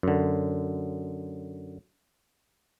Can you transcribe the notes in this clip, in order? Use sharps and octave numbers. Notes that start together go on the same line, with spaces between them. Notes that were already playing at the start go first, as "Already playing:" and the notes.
F#2 D3